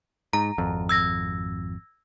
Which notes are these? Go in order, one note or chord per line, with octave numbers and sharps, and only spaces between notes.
G#2 A#5
G#1 F2
E6 G#6 A#6